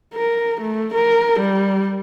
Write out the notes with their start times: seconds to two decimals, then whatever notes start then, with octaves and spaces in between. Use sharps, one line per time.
0.14 A#4
0.61 A3
0.94 A#4
1.40 G3